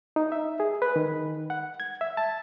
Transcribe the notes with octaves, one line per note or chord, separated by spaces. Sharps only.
D#4
E5
G#4
B4
D#3
F#5
G#6
E5
A5